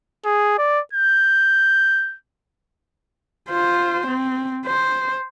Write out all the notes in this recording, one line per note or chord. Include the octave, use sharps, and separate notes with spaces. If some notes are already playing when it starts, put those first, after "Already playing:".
G#4
D5
G6
F4 C5
C4
C5